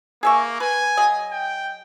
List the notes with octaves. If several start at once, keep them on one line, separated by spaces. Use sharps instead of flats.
A#3 G#4 E5 C#6
B4 G#5
F#3 G#4 D#5
G5